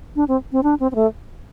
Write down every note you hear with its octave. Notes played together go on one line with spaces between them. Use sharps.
D4
C4
C4
D4
C4
C4
A3